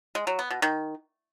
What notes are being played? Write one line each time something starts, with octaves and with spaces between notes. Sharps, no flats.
G#3
F#3
B3
B2
D#3